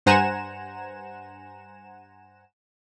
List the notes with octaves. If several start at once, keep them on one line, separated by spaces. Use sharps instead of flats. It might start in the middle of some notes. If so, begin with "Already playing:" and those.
G2 C5 F#5 G#5 A#5 E7